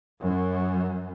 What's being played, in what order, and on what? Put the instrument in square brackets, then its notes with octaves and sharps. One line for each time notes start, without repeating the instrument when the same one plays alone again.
[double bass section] F#2